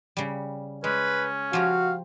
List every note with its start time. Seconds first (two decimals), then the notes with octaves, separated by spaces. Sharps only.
0.17 C#3 G3
0.84 G#3 C#4 B4
1.53 F3 F#4 G4 F5 A#5